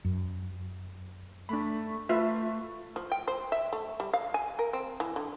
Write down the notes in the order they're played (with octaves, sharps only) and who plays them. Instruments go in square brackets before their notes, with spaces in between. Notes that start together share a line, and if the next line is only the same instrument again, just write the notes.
[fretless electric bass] F#2
[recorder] A3 [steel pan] D4 B5
[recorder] A3 [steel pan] F4 B4 E5
[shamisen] F3
G5
C5
E5
A3
G3
F5
G#5
A#4
C4
E3
D3